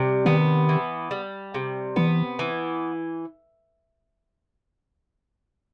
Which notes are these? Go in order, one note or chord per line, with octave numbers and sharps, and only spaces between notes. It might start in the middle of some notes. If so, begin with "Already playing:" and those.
Already playing: C3 G3
D#3 B3
E3
G3
C3
E3 B3
E3